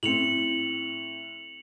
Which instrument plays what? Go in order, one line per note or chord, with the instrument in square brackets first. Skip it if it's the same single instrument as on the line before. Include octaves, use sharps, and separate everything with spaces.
[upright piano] A2 C4 [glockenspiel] C#7 F7 F#7